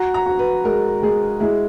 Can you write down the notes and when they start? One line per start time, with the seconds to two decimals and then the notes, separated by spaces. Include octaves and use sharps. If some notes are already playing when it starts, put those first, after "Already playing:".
Already playing: F#4 A#5
0.14 A#5
0.26 F#4
0.39 B4
0.65 G#3 A#4
1.03 G#3 G#4
1.40 G#3 E4